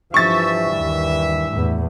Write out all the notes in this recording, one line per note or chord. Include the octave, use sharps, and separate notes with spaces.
G2 E3 F3 E5 C#6 A6
D#2
E2 A2